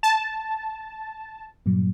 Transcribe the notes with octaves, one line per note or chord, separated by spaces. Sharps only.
A5
G2 A#2 F#3